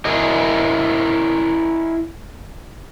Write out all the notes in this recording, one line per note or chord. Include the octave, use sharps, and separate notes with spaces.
E4 G#4 A#4 D#5